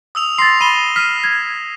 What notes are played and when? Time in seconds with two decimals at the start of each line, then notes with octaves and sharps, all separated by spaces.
0.15 D#6 E6 F7
0.38 C6 A6 A#6 C7
0.61 B5 D#7 E7 G7
0.96 F6 B6 D#7
1.24 G#6